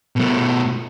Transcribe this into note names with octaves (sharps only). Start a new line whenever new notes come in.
B2 A3